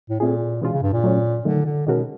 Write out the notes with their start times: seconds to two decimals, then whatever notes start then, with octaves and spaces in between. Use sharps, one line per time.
0.09 A2
0.20 A#2 A3 C4 F4 G#4
0.61 B2 E3 G#3 C#4 F4
0.72 C#3
0.82 G2
0.93 A#2
1.04 F#3 A3 C#4
1.45 D3 D#3 F#3 A3
1.66 D3
1.87 B2 D#3 G#3 C#4 F#4 A#4